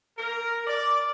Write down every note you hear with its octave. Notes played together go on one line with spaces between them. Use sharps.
A#4
D5